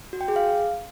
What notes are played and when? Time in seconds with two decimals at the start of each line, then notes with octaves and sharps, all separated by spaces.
0.13 F#4
0.21 G5
0.28 G#4
0.36 F5